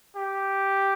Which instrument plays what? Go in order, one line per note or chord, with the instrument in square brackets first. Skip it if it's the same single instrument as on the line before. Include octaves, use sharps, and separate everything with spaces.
[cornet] G4